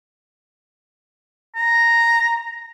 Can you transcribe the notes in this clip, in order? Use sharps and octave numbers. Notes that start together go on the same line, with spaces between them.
A#5